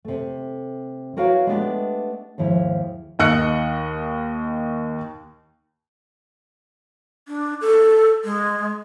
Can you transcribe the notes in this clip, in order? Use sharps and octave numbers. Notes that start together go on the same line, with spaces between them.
C3 A3
E4 F#4 A#4 B4 C#5 F5
G#3 A3 B3 D4 G4 B4
D#2 G#2 F3 E4
D#2 D#5 F#6 C#7
D4
A4
G#3